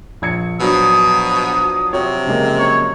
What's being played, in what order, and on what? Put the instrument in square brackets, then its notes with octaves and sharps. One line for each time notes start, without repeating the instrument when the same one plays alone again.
[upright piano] A#1 G#6 C#7
[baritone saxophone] B2 [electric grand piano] F3 F#3 D4 [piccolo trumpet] D#6
[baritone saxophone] C3 [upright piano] F#4 C#5
[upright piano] C#3 G#3 A#3
[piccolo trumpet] C#5